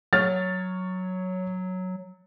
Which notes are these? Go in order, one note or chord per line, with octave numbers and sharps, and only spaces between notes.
F#3 C#5 F6 A6